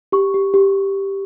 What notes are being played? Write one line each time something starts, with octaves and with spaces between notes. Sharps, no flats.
G4 C#6
G4
G4